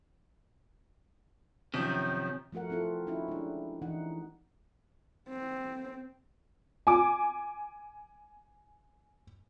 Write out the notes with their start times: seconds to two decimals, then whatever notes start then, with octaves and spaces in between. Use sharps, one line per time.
1.74 F#2 C3 D#3 F3
2.52 F3 A3 F#4 A#4 F#5
2.70 C4 E4 F4 A4
3.07 C#4 D#4 E4 F#4
3.28 G#3 D4
3.82 E3 D#4 F#5
5.29 C4
6.87 G#5 D6